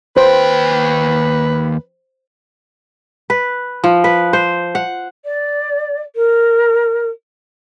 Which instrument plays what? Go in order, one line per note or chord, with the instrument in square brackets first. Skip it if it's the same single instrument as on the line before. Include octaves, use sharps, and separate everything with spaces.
[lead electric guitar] D#2 G5 [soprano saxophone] B4 [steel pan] C5
[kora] B4
F3
B4
C5
F#5
[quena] D5
A#4